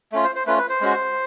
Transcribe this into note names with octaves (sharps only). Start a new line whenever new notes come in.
A3 C#4 F4
C5
C5
A3 C#4 F4 B4
B4
C5
G#3 C#4 F#4